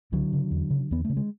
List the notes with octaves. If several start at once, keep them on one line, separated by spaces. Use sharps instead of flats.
C#2 D3 F#3
C#3
E2
C#3
E2 B3
C#3 A3
G#3